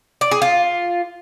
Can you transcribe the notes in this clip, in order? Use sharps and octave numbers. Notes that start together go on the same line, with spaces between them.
D5
G#4
F4